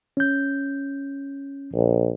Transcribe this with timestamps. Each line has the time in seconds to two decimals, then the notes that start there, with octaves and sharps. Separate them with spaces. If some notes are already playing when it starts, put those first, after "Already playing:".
0.17 C#4 G6
1.74 A#1